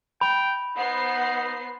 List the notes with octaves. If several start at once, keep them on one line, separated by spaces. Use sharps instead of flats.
G5 B5
B3 D#4 C5 F#5 C7